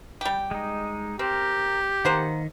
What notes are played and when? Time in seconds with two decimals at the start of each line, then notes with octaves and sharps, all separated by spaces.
0.21 G3 G4
0.51 G#3 D#4
1.19 C4 G4 A#4
2.05 D#3 A#3 C5 F#5